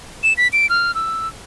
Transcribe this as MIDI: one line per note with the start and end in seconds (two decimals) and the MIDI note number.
0.23 0.33 100
0.37 0.48 95
0.53 0.69 98
0.70 0.94 89
0.95 1.28 88